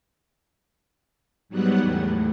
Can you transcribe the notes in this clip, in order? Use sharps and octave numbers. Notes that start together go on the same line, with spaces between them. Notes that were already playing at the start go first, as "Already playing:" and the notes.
G#2 F#3 G3 B3 F#5
E2 A2